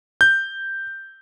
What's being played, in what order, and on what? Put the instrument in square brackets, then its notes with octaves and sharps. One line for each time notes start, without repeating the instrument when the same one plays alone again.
[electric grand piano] G6